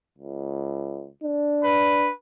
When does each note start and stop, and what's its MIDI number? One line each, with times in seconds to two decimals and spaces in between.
0.18 1.08 37
1.24 2.09 62
1.63 2.11 71